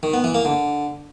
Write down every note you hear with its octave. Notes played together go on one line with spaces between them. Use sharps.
D#3
B3
E3
A#3
D3